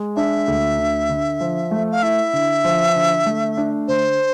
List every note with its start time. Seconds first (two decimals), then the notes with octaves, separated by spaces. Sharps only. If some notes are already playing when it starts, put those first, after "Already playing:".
Already playing: G#3
0.16 D4 E5
0.48 D2
0.78 D3
1.09 D3
1.41 F3
1.71 A3
1.91 F5
2.03 E4 E5
2.33 D3
2.64 F3
2.96 D3
3.26 A3
3.57 D4
3.88 D3 C5